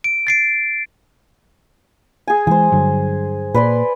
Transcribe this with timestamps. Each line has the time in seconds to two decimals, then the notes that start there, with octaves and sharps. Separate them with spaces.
0.04 D7
0.27 A6 C7 D7
2.27 G#4 G#5
2.47 E3 F3 G#3 C5 G#5
2.72 G2 D3 F#3
3.54 A#2 B4 D5 C6